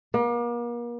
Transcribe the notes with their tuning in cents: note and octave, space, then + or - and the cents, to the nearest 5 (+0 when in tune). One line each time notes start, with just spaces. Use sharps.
A#3 +40